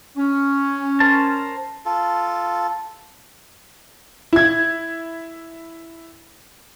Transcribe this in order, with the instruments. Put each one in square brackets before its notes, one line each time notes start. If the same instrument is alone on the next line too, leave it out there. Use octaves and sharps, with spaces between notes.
[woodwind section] C#4
[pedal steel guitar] A#4 C5 A5
[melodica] F4 A4
[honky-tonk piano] E4 G#6